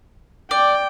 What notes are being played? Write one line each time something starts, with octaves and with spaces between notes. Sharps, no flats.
D5 G5